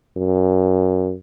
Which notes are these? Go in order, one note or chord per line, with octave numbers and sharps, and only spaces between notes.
F#2